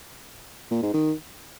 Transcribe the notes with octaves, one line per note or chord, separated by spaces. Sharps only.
A#2
G#2
D#3